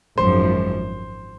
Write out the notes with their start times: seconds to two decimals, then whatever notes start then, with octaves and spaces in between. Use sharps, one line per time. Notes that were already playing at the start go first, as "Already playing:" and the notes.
0.18 G#1 F#2 F3 C5